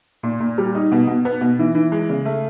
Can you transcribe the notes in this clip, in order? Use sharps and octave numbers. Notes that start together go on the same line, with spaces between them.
A#2
A#2
G3
D#4
B2
B2
B3
B2
E3
E3
G#3
C#3
A3